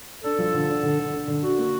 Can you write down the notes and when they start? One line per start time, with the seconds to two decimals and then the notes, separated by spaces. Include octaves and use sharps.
0.24 D4 A4
0.38 F3
0.54 D3
0.69 D4
0.83 D3
0.99 D3
1.14 D4
1.28 D3
1.43 D4 F#4
1.58 A#3